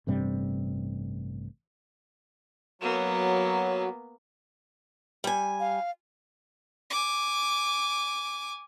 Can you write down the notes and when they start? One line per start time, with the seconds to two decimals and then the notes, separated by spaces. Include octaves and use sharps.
0.07 A1 G2 C3 G3
2.82 F#3 A#3 B3
5.24 G3 G#5
5.60 F5
6.90 G#5 D6